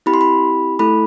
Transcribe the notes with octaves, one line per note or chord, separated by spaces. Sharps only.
C4 E4 G4 B5
C6
B5
A3 E4 A4 B5